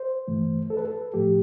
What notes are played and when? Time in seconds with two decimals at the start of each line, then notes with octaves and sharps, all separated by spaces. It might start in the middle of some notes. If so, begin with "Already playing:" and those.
Already playing: C5
0.28 G2 E3 A3
0.70 A4
0.77 B4
0.85 A4
1.14 A2 F3 A3 G4